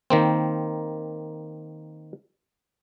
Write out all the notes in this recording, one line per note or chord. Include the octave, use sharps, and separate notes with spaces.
D#3 A#3 C4